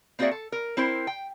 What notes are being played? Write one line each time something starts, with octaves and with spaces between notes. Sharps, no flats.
A#3 C4 F#4 G#4 D5 E5
A4
A#4
C4 E4 A#4 C5
G5